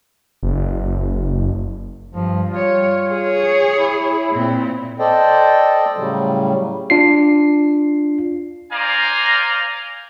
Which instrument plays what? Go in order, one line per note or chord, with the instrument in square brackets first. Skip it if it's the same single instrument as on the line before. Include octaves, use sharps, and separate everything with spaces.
[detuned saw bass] F#1
[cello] G2 [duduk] F3
[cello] G3 C#5 [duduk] F4
[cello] G#4 C#5
[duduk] E4
[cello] A#2 C4
[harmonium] A4 C5 D5 D#5 G5
A2 C#3 F#3 G3
[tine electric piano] D4 F4 C7
[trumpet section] C5 D5 F5 G#5 A#5